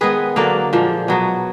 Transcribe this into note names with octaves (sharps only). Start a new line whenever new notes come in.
D#3 G#3 B3 G#4 B4
D3 F#3 A#3 D5 F5
A#2 F3 G#3
B2 F#3 B3